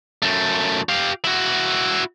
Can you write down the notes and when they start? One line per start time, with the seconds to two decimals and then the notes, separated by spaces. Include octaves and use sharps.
0.22 F#2 A3
0.89 G4 F5
1.24 E4 F#4